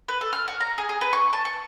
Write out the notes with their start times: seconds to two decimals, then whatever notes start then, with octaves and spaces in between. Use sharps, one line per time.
0.08 B4
0.21 A4
0.33 F6
0.48 F#4
0.60 A#5
0.78 G#4
0.89 G#4
1.01 B4
1.13 C#6
1.33 A5
1.45 C#6